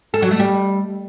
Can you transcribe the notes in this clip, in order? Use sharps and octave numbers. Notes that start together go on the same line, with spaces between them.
A4
F#3
A3
G3